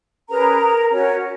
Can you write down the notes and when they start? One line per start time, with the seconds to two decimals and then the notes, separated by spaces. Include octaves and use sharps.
0.29 C#4 G#4 A#4 B4 A#5
0.91 C#4 F#4 A#4 C#5